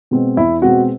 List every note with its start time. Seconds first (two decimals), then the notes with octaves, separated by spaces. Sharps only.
0.11 B2 G#3 C4
0.37 E2 E4
0.62 B2 G#3 C4 F#4